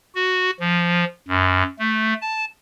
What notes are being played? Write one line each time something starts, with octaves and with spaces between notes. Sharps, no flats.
F#4
F3
F#2
A3
A5